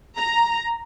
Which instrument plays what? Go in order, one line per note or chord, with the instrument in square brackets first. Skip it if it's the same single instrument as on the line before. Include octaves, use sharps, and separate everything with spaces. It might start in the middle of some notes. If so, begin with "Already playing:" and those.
[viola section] A#5